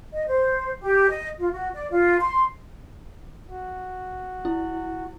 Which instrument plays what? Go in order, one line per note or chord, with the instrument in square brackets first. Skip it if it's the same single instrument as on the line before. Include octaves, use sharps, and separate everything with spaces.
[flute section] D#5
C5
G4
D#5
F4
F#4
D5
F4
C6
[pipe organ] F#4
[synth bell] E4